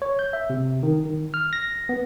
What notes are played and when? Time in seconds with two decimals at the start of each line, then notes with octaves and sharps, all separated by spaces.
0.02 C#5
0.19 G6
0.33 E5
0.50 C3
0.83 D#3
1.05 D#3
1.34 F6
1.53 A#6
1.89 B3